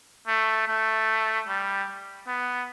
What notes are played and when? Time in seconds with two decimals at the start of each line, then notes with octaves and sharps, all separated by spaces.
0.27 A3
0.68 A3
1.48 G3
2.27 B3